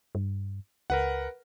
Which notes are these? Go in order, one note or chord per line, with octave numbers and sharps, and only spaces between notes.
G2
C#2 A#4 B4 F#5